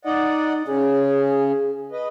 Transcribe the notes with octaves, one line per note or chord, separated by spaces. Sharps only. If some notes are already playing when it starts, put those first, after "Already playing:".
D#4 D5 D#5 F#5
C#3 C#4 G#4
B4 D#5